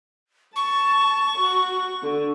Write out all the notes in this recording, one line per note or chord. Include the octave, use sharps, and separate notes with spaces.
A5 C#6
F#4
D3